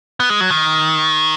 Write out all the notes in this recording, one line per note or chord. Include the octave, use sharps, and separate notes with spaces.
B3
G#3
F#3
D#3